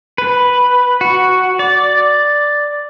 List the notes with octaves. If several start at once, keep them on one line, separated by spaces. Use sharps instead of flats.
B4
F#4
D5